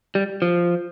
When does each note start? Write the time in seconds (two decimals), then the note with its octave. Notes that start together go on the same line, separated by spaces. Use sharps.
0.15 G3
0.42 F3